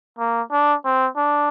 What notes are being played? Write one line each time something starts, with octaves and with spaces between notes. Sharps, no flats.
A#3
D4
C4
D4